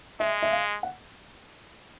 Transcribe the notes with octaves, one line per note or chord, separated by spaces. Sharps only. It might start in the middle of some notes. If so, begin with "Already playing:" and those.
G#3 E5
E5
F5
F#5